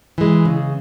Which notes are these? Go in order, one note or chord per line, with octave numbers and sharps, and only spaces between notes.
E3 G#3
C#3